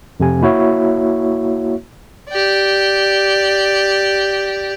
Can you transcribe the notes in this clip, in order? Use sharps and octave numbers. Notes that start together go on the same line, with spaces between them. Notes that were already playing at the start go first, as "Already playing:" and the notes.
F2 C3 G#5
A#3 E4 F#4 C#5 E5
G4 D5